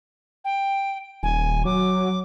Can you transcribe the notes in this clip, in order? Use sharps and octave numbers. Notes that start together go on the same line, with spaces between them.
G5
D#1 G#5
F#3 D6